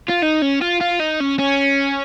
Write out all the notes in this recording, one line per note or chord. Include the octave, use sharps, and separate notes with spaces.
F4
D#4
C#4
F4
F4
D#4
C#4
C#4